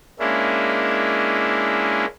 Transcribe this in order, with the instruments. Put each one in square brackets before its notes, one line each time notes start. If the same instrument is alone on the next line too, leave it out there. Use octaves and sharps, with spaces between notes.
[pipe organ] G#3 A#3 C#4 D4 E4